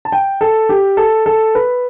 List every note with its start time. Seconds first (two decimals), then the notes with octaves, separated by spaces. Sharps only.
0.05 A5
0.12 G5
0.41 A4
0.69 G4
0.97 A4
1.26 A4
1.55 B4